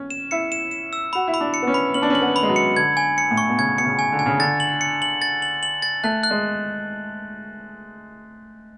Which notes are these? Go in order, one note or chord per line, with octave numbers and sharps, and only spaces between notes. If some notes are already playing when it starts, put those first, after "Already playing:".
Already playing: C#4
E7
E4 C#7
E7
E7
E6
F#4 B5
E4
B5
D4
C#7
B3
C#4
B5
C#4 F#7
D4
C#4
F#7
B3
B5
G#3
F#3
C#7
D3 G#6
G#5
C#7
A2
C#6
B2
C#3 G#6
B2 C#7
C#3
G#5
D3
G#5
C#3
D3 A6
F#7
C#7
F#7
A6
F#7
F#7
A6
A3 F#6
F#6
G#3